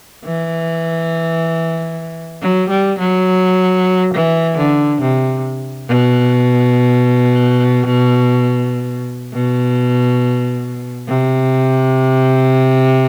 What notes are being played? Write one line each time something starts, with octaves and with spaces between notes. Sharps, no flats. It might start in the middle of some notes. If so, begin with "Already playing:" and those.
E3
F#3
G3
F#3
E3
D3
C3
B2
B2
C3